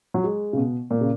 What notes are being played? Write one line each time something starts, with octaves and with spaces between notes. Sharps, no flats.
F#3
G#3
C#3
B2
A#2
C#3